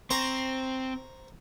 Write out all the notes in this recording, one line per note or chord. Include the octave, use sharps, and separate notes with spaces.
C4 C5 A#5 C#6